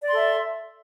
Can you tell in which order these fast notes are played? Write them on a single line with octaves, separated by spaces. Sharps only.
D5 C6 A4 E5